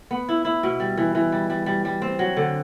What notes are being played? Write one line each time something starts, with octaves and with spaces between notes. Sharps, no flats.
B3
E4
E4
B2
G3
E3
E3
G3
G3
G3
G3
C4
F#3
D3